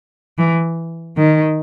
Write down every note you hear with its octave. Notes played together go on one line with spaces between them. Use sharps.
E3
D#3